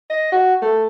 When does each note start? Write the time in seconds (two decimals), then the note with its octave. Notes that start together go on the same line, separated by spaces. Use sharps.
0.10 D#5
0.32 F#4
0.62 A3